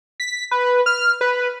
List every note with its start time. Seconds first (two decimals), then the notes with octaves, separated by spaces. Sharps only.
0.20 B6
0.51 B4
0.86 F6
1.21 B4